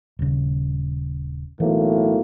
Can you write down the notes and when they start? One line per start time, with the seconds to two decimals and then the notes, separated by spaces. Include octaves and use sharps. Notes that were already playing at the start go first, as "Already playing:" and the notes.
0.19 D#1 C#3
1.60 B1 A2 E3 A#3